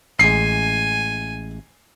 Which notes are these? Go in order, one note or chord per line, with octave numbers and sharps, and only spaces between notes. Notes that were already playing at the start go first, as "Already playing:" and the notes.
A1 G#3 G#5 C7